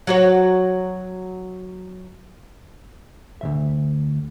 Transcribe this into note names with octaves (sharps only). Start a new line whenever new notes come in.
F#3 F#4 C#5
D2 B2 E5